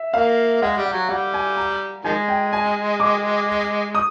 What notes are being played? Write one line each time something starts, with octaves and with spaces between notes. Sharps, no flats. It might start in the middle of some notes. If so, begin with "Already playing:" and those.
Already playing: E5
A#3 F5
G#3 F#5
G3
F#5
F#3
G3 F#5
G#5
A#5
D#3 F3 G#3 G#5
G5
G#5
D6
D#6